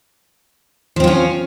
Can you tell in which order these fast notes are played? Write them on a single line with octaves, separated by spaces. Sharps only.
F3 C4 F4 C#4